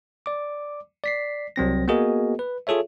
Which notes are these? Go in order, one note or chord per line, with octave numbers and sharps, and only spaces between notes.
D5 D6
D5 B6 C7
C2 F#3 C4 A#6
A#3 B3 F#4 G#4 A#4 D#5
B4
F4 G#4 A4 C#5 E5